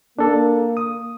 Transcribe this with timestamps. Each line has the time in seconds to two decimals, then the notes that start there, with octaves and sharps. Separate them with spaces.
0.19 A#3 D4 A4
0.77 D#6